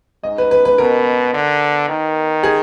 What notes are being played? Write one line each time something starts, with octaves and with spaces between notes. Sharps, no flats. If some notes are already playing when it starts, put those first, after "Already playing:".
G#2 D#5
B4
B4
B4
B2 A#4
D3
D#3
G#4